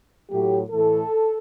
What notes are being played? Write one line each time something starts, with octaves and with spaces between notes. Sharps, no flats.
A2 F#3 A3 G4
A2 E3 A3 A4